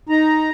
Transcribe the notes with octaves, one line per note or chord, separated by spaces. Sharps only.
D#4 A#5